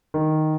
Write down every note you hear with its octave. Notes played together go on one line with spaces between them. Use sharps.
D#3